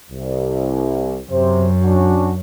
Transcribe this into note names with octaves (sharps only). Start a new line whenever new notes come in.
C2
F#2 C3 C5
C#4 D4 F#4